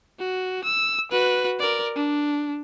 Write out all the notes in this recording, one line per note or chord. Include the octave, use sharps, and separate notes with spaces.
F#4
E6
F#4 B4
A#4 D5
D4